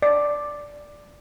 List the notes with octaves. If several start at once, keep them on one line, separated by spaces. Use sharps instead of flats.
D5